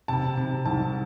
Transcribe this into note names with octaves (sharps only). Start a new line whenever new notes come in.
C3 A5
C3
C2 A5